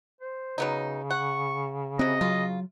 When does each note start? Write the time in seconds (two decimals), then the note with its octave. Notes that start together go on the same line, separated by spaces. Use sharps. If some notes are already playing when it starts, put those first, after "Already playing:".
0.21 C5
0.58 C#3 F#3 B3 D#4
1.10 F#5 C#6
1.99 C3 C4 F#4 D#5
2.21 F#3 F4